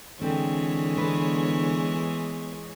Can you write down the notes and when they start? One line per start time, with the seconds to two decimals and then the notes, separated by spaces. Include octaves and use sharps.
0.21 D3 E3 G#3 C4 C#5
0.97 B3 B4 C5